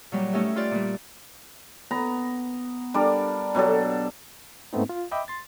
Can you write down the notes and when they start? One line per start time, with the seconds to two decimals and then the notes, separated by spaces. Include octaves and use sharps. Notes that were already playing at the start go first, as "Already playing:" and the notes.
0.12 A#2 F#3 G3
0.33 A3 C#4 D#4 G4 E5
0.56 F4 G4 B4 D5
0.71 A#2 G3
1.91 B3 A#5
2.94 G3 D4 A#4 D5
3.54 B2 F#3 G4 A4
4.73 G#2 A3 B3 C4 D#4
4.89 F4
5.11 D#5 E5 G5 B5 D6
5.28 C6 A6